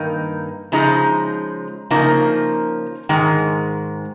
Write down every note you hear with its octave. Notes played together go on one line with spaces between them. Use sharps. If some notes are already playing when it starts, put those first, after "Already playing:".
Already playing: G2 D#3 A#3 D#4
C#3 F3 G#3 D#4
C#3 F3 A#3 D#4
G#2 D#3 G#3